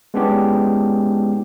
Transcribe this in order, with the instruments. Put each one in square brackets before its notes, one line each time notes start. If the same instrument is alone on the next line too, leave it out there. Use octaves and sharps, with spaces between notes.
[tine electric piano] G#3 B3 C#4 D4 E4 G4